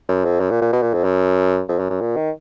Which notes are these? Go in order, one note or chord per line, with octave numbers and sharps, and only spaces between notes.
F#2
F2
F#2
A#2
A#2
B2
A#2
F2
F#2
F2
F#2
F#2
A#2
D#3